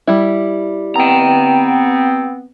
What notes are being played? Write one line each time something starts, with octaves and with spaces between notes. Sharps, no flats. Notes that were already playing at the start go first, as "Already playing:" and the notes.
G3 E4
B3 C4 G5 A#5